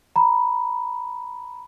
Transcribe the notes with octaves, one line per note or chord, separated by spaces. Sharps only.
A#5 B5